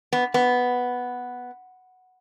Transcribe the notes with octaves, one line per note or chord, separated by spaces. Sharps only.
B3
B3